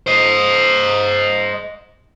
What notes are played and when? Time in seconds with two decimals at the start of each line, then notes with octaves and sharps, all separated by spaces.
0.07 C5 D#5